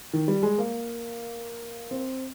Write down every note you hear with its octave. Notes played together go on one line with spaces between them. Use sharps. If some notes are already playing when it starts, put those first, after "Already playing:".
D#3
G3
G#3
A#3
C4